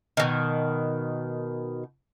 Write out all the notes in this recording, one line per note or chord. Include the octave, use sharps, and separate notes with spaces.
B2 D#3